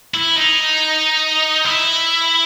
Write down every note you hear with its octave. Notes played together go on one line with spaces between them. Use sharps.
E4
D#4
E4